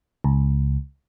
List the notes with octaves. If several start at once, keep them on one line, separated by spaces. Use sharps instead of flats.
C#2